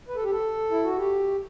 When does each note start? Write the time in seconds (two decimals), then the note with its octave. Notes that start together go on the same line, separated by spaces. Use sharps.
0.08 B4
0.16 A4
0.23 G4
0.31 A4
0.71 E4
0.84 F#4
0.97 G4